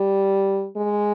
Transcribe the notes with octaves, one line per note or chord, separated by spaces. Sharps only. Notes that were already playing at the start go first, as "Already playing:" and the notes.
Already playing: G3
G#3